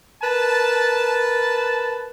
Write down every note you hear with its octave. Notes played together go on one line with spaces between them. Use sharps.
A#4 B4 A5